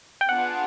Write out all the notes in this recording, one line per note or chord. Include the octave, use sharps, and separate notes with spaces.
G5
B3 D4 F4 G#4 F#5